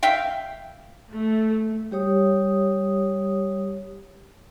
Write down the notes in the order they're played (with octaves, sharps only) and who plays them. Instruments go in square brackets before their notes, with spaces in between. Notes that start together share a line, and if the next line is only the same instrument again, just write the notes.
[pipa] E5 F5 G5
[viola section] A3
[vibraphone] G3 G4 C#5 D#6